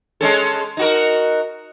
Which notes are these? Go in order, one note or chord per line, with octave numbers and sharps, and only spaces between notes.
G#3 C#4 A4
D#4 F#4 A#4